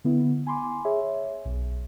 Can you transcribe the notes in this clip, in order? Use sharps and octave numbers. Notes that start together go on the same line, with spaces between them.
D3 B3 E4
G#5 B5 C6 D6
G#4 C#5 E5
B1